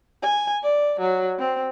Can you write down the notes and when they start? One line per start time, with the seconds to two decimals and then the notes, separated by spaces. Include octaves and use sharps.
0.23 G#5
0.63 D5
1.00 F#3
1.39 C4